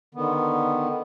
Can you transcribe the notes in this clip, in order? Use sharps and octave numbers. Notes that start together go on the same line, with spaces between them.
D3 D#3 B3